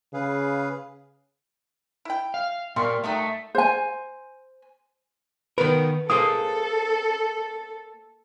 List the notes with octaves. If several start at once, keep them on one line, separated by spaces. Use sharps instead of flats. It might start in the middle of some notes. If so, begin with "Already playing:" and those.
C#3 G#4 B4 F5
E4 G5
F5
A#2 G3 A#3 C6 C#6
D#3 F#3 A3 D#4
C5 G#5
D#3 B3 A#4 B4
A#3 G#4 A4 C5 D#6